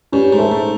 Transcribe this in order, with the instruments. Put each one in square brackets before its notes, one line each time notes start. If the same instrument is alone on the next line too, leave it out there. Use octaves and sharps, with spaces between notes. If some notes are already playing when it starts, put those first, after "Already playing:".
[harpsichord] G2 [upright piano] C#4
[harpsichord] G#2
[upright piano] A3
[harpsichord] G#2